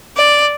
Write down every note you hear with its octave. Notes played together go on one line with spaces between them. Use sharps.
D5